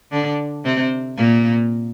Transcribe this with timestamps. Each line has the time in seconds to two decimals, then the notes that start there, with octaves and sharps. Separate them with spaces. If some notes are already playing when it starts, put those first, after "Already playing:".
0.12 D3 D4
0.65 C3 C4
1.17 A#2 A#3